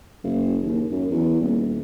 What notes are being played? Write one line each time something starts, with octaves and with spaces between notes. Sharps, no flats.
F#1
D#2
F#2
E2
D#1